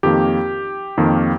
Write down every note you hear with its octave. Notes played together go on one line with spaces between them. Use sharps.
F2 D#3 A#3 G4
F2 D#3 A#3